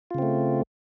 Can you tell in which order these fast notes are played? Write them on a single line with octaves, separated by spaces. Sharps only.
F4 C#3 C4 A3